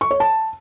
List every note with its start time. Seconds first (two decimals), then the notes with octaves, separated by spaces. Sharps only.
0.01 C#6
0.11 C#5
0.20 A5